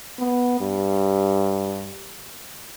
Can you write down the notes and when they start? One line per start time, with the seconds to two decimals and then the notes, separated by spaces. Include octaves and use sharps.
0.19 B3
0.61 G2